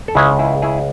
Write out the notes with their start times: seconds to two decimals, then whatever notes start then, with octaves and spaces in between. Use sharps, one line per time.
0.08 A4
0.15 C#2 C#3 G#3 C#4 E4 G#4
0.39 E4 G#4
0.62 E4 G#4